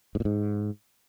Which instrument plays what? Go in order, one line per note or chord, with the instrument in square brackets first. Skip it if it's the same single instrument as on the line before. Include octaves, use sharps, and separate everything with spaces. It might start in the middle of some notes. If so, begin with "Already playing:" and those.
[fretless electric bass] G#2
A#2
G#2